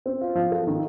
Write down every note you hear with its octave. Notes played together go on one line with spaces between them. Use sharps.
C4
F4
F3
A4
D#3